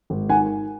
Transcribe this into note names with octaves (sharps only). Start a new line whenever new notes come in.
G#1
D#3 F#5 G#5